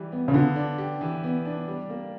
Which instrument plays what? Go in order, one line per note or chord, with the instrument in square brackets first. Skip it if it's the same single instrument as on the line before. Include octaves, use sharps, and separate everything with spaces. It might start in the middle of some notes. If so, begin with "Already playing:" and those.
Already playing: [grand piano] E3 G3
B3
[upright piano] C#3
[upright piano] D3 [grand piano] B3
[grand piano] D4
G4
E3
B3
D4
G3
A#3